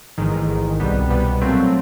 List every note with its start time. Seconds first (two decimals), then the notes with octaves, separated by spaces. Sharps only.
0.18 A1 G#2 D#3
0.48 A1 G#2 D#3
0.80 C2 B2 G3 B3
1.10 C2 B2 G3 B3
1.41 A#2 F#3 A3 C4